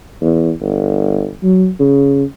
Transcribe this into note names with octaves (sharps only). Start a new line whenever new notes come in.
E2
G1
F#3
C#3